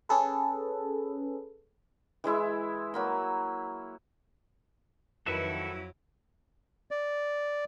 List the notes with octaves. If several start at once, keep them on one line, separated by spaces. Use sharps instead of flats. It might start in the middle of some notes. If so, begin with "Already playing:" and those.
C#4 G#4 A4 B4
E3 G#3 E4 E5
F#3 A#3 B5
F2 D#3 F#3 E4 F#4 A4 B4 E5
D5